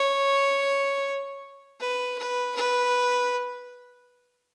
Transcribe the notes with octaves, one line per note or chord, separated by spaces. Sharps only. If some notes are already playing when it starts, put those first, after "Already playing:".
Already playing: C#5
B4
B4
B4